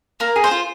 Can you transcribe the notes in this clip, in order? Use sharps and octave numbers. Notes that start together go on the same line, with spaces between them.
A#3 A#4
G#4
C5
F4